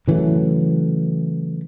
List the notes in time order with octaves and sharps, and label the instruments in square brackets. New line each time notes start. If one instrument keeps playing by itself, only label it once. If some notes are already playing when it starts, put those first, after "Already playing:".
[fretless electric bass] C#3 E3 F#3 A3